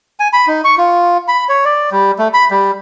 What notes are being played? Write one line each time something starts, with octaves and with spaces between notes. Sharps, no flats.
G#5
B5
D#4
C#6
F4
B5
C#5
D5
G3
A3
B5
G3